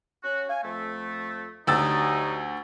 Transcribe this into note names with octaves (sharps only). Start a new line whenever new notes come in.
C#4 F#4
F5 G#5
F2 A3
D2 F#3 G3 D#4 E6 A6